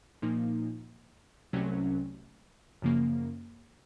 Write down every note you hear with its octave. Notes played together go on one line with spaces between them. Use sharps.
A#2 F3 A#3 D#4
C2 C3 F#3 A3 C#4
F#2 C#3 F3 A#3